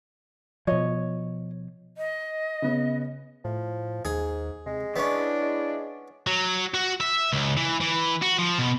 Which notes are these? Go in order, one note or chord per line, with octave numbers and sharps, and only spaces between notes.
B2 F3 C#5 D#5
D#5
C#3 B3
A2 F3
D#2 G#2 G#4
C3 G#3
B3 C#4 D4 E4
G#3
F#3
F#4
E5
C#2
E3
E3
F#4
F3
B2